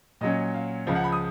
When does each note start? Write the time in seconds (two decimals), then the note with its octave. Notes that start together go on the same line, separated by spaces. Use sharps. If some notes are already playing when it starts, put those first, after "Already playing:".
0.21 A#2 F#3 C#4 D#5
0.54 F5
0.87 C#2 C#3 F3 F5
0.95 F#5
1.04 B5
1.12 D#6